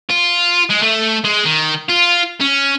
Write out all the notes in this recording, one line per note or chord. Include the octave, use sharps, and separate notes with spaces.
F4
G#3
A3
G#3
D#3
F4
C#4